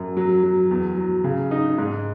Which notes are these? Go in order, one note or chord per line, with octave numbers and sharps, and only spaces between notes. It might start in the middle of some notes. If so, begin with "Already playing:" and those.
Already playing: F#2
F#3
F#3
E2
F#3
C#3
D#4
G#2